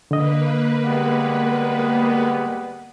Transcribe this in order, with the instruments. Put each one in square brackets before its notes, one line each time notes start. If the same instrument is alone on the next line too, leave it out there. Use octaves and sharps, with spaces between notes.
[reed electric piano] D3 D#5 [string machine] A#3 B4
[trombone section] G3 G#3 B3